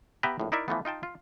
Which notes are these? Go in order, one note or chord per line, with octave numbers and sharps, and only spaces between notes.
B3 G4 B4 E5 G5 A#5
A#1 A2
D#4 E4 A#4 D5 E5
E3 F3 A3 B3
D#4 F4 G5 A5
F4